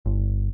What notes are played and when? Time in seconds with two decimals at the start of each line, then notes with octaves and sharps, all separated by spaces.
0.06 G1